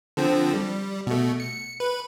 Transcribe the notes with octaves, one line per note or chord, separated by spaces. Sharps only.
D3 F3 C4
G3
B2 A3
C#7
B4